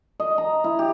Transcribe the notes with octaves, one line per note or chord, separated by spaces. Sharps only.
D#5
A#5
E4
G4